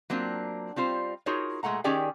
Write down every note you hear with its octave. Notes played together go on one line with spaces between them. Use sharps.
F#3 A#3 C4 D4 F4
G3 C4 F4 C5
D#4 F4 F#4 G#4 A#4 C#5
A#2 G#3 A3 F#5 A#5
D#3 C#4 G4 G#4 D5 G5